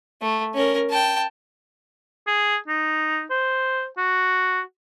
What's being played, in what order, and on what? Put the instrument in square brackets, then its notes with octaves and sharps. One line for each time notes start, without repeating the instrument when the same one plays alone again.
[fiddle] A3
C#4 A#4
G5 A5
[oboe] G#4
D#4
C5
F#4